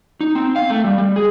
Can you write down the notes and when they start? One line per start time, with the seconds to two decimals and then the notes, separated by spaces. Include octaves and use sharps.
0.21 D#4
0.35 C4
0.56 F5
0.70 A3
0.84 G3
0.98 G3
1.16 G#4